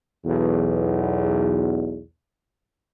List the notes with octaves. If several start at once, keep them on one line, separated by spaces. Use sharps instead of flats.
B1 E2